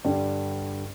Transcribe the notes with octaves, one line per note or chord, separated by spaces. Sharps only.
G2 D3 G3